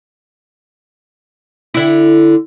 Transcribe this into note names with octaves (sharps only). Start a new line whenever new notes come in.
D3 E4